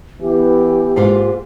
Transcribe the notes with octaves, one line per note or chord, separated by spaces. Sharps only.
E3 B3 G4
G#2 A#3 F4